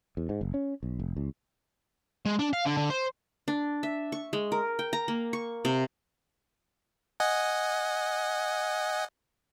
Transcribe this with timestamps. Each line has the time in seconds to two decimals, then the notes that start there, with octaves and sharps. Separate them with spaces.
0.17 E2
0.29 G#2
0.41 F#1
0.54 C#4
0.83 B1
1.00 F1
1.17 C#2
2.26 G#3
2.39 D4
2.53 F5
2.66 D3
2.77 D3
2.90 C5
3.48 D4
3.83 E5
4.12 C#6
4.33 G#3
4.52 A#4
4.79 G5
4.93 A#5
5.08 A#3
5.33 C#6
5.65 C3
7.20 D#5 F#5 G#5